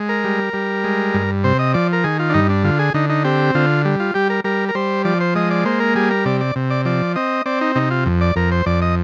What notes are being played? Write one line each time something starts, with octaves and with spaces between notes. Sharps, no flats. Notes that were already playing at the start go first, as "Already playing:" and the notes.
Already playing: G#3
A#4
G3
G3
G#3
G2
C3 C5
D#5
F3 D5
A#4
D#3 G#4
F4
D4
G2 D#4
D4
D3 F4
G#4
D3 D#4
D#4
C4 G4
D3 F4
G3
F4
G3 G4
A#4
G3 A#4
A#4
G3 C5
F3 D5
C5
G#3 D#5
D5
A#3 C5
A#4
G3 G#4
A#4
C3 D5
D5
C3
D5
F3 D5
C4 D#5
C4 D5
D#4
C3 D#4
F4
F2
D5
F2 A#4
C5
F2 D5
D#5